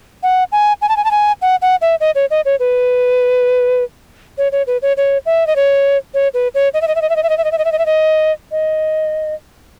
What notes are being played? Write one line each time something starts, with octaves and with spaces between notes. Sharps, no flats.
F#5
G#5
G#5
A5
G#5
A5
G#5
F#5
F#5
E5
D#5
C#5
D#5
C#5
B4
C#5
C#5
B4
C#5
C#5
E5
D#5
C#5
C#5
B4
C#5
D#5
E5
D#5
E5
D#5
E5
D#5
E5
D#5
E5
D#5
E5
D#5
E5
D#5
E5
D#5
D#5